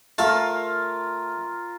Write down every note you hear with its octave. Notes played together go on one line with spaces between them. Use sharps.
A3 F4 A#4 F5 A5